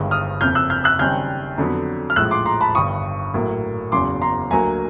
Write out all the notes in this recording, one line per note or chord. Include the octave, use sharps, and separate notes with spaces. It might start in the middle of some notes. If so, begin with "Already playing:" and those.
Already playing: G1 G2 D#3 G#3
D#6 F6
F#1 F2 C3 F6 G6
E6 F#6
F6 G6
E6 F#6
F#1 F#2 D#3 G3 C4 F6 G6
F2 D3 F#3 B3
F6
A#1 A2 F3 G#3 E6 F#6
C6 D6
A#5 C6
A5 B5
G1 G2 D#3 C#6 D#6
A#1 A2 F#3 A#3
F#1 E2 C#3 F#3 C6 D6
A#5 C6
D2 D3 F#3 A#3 G#5 A#5